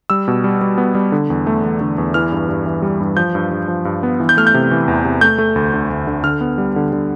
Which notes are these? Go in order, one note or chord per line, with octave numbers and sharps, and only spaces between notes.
G3 E6
B2
G3
G3
B3
G3
D3
E2
A3
E2
D3
E2
E3 F6
G2
G2
E3
G3
G2
F3 G6
G2
G2
F3
G2
B3
E3
G6
A3 F6
G6
C3
E3
E2
C3
A3 G6
A3
D2
D3
D2
D3
D3 F6
B3
G3
D3
D3